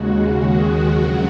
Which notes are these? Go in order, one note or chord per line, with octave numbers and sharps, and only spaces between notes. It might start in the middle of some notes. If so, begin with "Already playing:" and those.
Already playing: D#2 C#3 G#3 F#4
D#2 D#3 G#3 F#4
F2 C#3 F#3 F#4